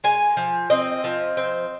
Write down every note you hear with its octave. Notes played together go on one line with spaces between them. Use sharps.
G#3 G#5
F3
C4 D#5
F3
C4